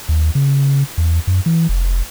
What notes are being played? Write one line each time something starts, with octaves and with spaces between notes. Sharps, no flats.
D#2
C#3
E2
F#2
E3
F1